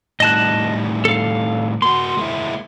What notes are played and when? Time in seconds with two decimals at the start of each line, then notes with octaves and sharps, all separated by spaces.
0.20 A2 D#3 G3 D#5 A5 F#6
1.05 A4 F5
1.82 A#3 F#4 C6
2.17 G#3 A#3 E4